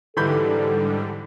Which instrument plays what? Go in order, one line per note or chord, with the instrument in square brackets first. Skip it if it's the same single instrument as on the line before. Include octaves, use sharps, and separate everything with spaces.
[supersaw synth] G#2 D3 G3 [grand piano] E3 B5 G6 [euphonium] A4